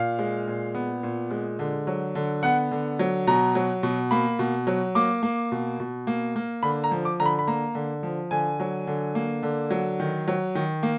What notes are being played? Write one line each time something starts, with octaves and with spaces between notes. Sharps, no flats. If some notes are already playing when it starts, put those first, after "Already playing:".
Already playing: A#2 F5
G#3
A#2
B3
A#2
G#3
D3
F#3
D3
B3 F#5
D3
F#3
B2 A#5
F#3
B2
A#3 B5
B2
F#3
A#3 D6
A#3
B2
B2
A#3
A#3
D3 B5
A#5
F3
D6
D3 A#5
B5
B5
A#3 A#5
D3
F3
D3 G#5
F#3
D3
A#3
D3
F#3
D#3
F#3
D#3
A#3